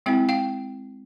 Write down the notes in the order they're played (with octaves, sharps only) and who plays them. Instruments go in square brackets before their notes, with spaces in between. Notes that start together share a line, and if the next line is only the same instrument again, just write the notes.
[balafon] G#3 C4 E4 G5
F5 G5